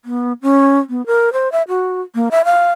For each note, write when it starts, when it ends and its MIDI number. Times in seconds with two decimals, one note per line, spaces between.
0.05 0.33 59
0.42 0.79 61
0.90 1.05 59
1.06 1.33 70
1.33 1.51 72
1.52 1.63 76
1.68 2.01 66
2.15 2.29 58
2.31 2.42 76
2.45 2.72 77